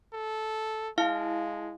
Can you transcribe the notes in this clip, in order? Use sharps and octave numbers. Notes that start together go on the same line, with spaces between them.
A4
G#3 E4 F5 A5